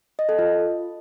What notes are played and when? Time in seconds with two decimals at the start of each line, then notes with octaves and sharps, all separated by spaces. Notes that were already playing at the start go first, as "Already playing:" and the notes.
0.19 D#5
0.29 A4
0.39 F4